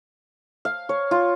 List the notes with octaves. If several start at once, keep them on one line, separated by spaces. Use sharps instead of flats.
F5
C#5
F4